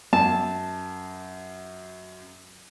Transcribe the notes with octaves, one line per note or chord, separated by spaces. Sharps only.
F#2 A5